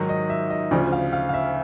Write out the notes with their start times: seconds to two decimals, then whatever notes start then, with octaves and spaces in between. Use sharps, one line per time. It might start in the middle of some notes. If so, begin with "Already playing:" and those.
Already playing: G#2 D#3 F#3
0.09 D#5
0.30 E5
0.50 D#5
0.71 D2 C#3 F3 D5
0.92 F5
1.13 F5
1.29 F5
1.34 E5